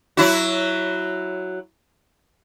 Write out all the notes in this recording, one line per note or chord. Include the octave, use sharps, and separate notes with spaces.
F#3 E4 F#4